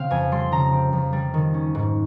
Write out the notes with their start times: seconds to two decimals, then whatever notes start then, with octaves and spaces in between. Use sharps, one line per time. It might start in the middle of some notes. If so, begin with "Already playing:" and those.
Already playing: C#3 C4 F5
0.11 F2 G#5
0.32 G3 C6
0.52 C#3 A#5
0.73 C4
0.93 F2
1.13 G3
1.34 D#3
1.54 C#4
1.75 G#2